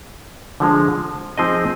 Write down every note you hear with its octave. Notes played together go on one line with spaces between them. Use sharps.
D3 F3 G#3
F3 C4 D#4 G#4 D#5